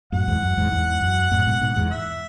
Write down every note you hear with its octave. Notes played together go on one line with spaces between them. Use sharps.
F#2 A2 F#5
E2 G#2
F#2
E2 G#2
E2 G#2
F#2
F#2 A2
G#2 B2
G#2 B2
E2 G#2
E5